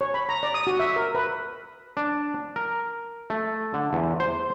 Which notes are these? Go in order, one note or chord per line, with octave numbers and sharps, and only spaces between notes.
C#5
B5
A#5
D5
D#6
F#4
E5
A#4
B4
D4
A#4
A3
D3
E2
C5